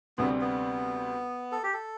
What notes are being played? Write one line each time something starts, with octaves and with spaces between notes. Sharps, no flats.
D2 C3 G3 B3 C4
B3
A4
G4
A4